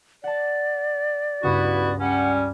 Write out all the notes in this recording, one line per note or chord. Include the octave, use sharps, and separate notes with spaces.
D5 F#5 A5
C#2 G2 B3 E4 F#4
G3 C#4 F#5